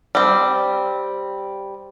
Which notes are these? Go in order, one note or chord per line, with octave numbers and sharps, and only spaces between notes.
G3 C4